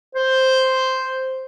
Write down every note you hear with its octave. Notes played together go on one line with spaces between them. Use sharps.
C5